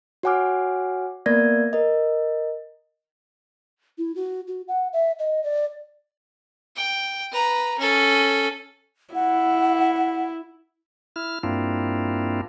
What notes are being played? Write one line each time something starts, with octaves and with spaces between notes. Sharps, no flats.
F#4 C#5 F#5 G#5 D6 F6
A#3 B3 A#4 D5 G#6 A#6
A#4 D#5
E4
F#4
F#4
F#5
E5
D#5
D5
G5
B4 A#5
C#4 A4
E4 F#5
E4 F6
G2 A#3 C4 D4 E4 F4